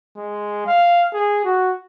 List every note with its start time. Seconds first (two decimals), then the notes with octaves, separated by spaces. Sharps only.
0.17 G#3
0.66 F5
1.14 G#4
1.45 F#4